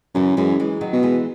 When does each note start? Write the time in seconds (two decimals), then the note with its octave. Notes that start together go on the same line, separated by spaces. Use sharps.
0.15 F#2 C#3 E3
0.37 F#2 E3 G#3
0.60 E3 G#3
0.81 D#3 F#3
0.93 B2
1.03 E3 G#3